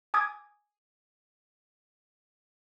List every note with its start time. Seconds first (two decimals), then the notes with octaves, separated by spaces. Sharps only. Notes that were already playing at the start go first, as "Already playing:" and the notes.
0.14 G#5 D6 D#6 G#6